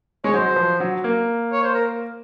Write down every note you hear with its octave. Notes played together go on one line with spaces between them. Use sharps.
G#3 C#5
F#3 C5
F3
F#3
A#3
C#5
C5
A#4